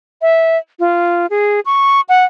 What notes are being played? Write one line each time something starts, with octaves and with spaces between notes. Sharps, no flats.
E5
F4
G#4
C#6
F#5